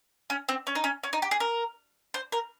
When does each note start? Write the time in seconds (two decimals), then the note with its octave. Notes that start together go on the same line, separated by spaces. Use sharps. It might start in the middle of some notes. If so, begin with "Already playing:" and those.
0.30 C#4
0.49 C4
0.67 C#4
0.75 D#4
0.84 C#4
1.04 C#4
1.13 D#4
1.22 G4
1.31 G#4
1.40 A#4
2.14 C5
2.32 A#4